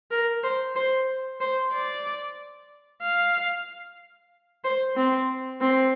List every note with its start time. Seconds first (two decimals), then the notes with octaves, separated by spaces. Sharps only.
0.11 A#4
0.43 C5
0.76 C5
1.40 C5
1.72 D5
3.02 F5
4.64 C5
4.96 C4
5.61 C4